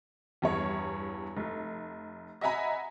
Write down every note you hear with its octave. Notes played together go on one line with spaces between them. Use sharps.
E2 G2 C#5
F1
D#5 E5 F#5 G#5 A#5 B5